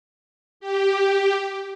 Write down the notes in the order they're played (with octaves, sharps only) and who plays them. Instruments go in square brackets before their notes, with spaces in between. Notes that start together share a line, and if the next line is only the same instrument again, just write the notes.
[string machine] G4